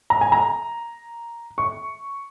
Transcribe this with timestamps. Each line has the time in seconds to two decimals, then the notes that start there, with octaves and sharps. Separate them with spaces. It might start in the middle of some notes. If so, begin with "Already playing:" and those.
0.10 A#5
0.21 G#5
0.32 A#5
1.58 C#6